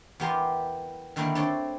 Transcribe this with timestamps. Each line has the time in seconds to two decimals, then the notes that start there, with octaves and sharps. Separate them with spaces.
0.20 E2 B3 G4 A#4 G#5 C6
1.16 D3 D#3 G3 A#3 D4 E4
1.35 A3 C4 D4 A4 C#5